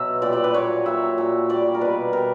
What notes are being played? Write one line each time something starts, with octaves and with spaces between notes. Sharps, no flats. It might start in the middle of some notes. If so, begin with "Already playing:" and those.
Already playing: B2 F#3 E5
A#2 G3 D5
D5
B4
A#2 F#3 C#5
A#2 F#3 E5
A#2 F#3
A#2 G3 D5
A#4
B2 G3 B4
B2 G3 A#4